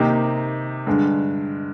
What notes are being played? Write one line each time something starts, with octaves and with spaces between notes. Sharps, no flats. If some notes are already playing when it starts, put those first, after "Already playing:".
Already playing: C3 D#3 A#3 D#4 G4
G2 D3 G#3